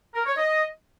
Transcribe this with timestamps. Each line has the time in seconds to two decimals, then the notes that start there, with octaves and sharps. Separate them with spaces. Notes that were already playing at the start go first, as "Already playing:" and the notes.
0.14 A#4
0.26 C#5
0.37 D#5